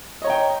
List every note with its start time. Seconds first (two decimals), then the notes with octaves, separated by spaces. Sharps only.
0.22 D#5
0.24 C#5
0.27 A#5
0.30 G5